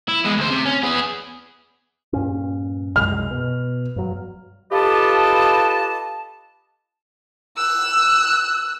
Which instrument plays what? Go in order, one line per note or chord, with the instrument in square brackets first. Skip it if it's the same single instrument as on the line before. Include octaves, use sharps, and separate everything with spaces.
[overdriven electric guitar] E4
G#3 B3
D2 C5
C3
C#4
B3 G#4
[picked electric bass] G2 A#2 C#4
[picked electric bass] C2 F#2 G#3 [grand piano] F6
[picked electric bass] B2
G2 F#3
[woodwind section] F4 G4 A4 B4 D#5 A5
[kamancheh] E6 F#6